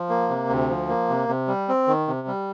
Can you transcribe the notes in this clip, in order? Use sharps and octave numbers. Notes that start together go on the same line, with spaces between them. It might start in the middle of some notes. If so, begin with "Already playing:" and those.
Already playing: F3
A#3
C3
D2
F3
A#3
C3
C3
G3
C4
D#3
C3
G3